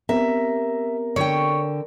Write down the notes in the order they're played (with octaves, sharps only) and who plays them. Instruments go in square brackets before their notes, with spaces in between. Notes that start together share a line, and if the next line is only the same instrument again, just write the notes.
[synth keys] B3 C4 G4 [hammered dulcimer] A#4 [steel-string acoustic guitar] E5
[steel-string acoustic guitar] D3 G5 [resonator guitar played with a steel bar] C#5